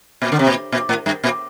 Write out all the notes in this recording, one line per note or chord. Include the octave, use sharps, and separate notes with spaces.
A#2
D3
C3
A#2
A#2
A2
G2
A#2